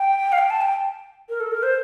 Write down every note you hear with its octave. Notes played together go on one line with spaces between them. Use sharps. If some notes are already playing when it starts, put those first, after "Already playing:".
Already playing: G5
F5
G5
A5
G5
A#4
A4
A#4
C5